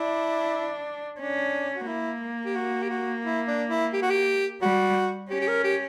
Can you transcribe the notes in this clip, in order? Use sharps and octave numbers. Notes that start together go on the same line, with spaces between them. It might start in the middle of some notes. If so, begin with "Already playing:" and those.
Already playing: D4 E4
C#4 D4
F#4
A#3 E4
G4
F#4
G4
F#4
E4
D4
E4
G4
F#4
G4
G3 F#4
C#4 G4
G4
A#4
G4